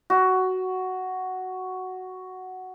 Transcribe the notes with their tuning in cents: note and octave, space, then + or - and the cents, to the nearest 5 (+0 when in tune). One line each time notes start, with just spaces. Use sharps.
F#4 +5